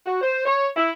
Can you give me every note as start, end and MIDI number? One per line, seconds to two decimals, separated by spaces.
0.06 0.19 66
0.21 0.43 72
0.45 0.68 73
0.77 0.92 64